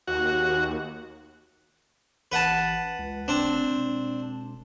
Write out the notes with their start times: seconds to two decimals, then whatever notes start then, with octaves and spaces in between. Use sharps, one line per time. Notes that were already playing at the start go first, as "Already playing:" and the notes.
0.07 D#2 F#4
2.32 A1 B4 F#5 A5
2.99 C#2
3.28 F1 C4 D4
3.70 E1